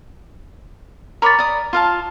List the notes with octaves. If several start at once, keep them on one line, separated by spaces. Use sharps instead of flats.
A#4 C#5 A#5 B5 D6 A6
D5 D#6
F4 F5 A5